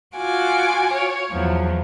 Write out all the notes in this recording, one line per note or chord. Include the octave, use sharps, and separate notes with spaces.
F4 F#4 G#5 D6
C#5
E2 F3 F#3